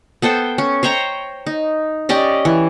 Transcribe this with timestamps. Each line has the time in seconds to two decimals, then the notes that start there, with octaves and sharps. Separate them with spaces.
0.22 B3 A4 C5 G5
0.58 C#4
0.83 C5 C#5 G5 A#5
1.47 D#4
2.09 C#4 G4 D5 D#5
2.45 E3